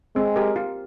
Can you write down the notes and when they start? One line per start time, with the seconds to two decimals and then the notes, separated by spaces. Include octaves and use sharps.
0.16 G#3 C4
0.36 G4 A#4
0.56 F4